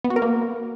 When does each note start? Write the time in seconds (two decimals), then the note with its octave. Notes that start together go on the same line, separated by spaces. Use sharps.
0.04 B3
0.10 F#4
0.16 A#4
0.22 A#3